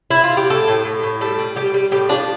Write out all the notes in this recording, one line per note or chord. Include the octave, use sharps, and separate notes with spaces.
E4
F4
G4
A2 A4
A2
A2
A2
G3 A4
G3
G3 G4
G3
A2 G4
F3 D4